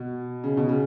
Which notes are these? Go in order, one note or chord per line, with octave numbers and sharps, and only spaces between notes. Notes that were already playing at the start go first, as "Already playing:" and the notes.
Already playing: B2
C#3
B2
C#3